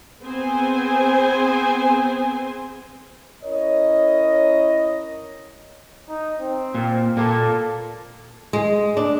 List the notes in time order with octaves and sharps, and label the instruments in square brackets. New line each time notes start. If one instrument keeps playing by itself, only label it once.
[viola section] B3 C4 G#4 C5 G#5
[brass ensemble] C#4 E4 A#4 C#5 D#5
[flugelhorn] D#4
C4
[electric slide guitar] A#2
[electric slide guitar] A#2 A#3 [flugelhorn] A4
[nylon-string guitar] G#3
D4